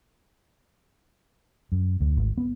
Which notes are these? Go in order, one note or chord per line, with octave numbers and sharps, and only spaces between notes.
F#2
D2
G#1
B3